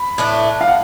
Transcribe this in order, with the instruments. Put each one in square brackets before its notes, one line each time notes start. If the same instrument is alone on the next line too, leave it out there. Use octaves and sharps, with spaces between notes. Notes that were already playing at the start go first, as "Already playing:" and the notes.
Already playing: [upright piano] B5
[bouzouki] A2 E3 A3 D4
[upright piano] F5
F#5